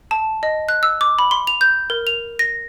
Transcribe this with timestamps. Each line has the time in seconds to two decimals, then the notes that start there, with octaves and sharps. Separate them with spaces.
0.11 A5
0.43 D#5
0.69 F#6
0.83 E6
1.01 D6
1.19 B5
1.31 C6
1.47 F7
1.61 G6
1.90 A#4
2.07 F7
2.39 A#6